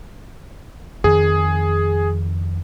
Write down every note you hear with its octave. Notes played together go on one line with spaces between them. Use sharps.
F2 D#3 G#4